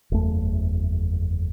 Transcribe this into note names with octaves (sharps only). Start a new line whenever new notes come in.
F#1 E2 A3